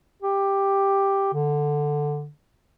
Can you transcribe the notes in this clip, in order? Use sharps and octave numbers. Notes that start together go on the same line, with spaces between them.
G4
D3